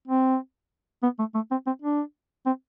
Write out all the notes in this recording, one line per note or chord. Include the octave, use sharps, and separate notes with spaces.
C4
B3
A3
A3
C4
C4
D4
C4